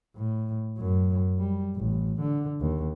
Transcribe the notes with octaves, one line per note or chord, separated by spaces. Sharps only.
A2
F#2
G3
A1
D3
D#2